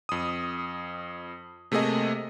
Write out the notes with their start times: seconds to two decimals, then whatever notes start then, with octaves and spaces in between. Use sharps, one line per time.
0.09 F2 D#6
1.72 C3 A3 A#3 G#4 D#5